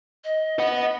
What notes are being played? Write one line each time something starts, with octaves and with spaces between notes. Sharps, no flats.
D#5
B4 F#5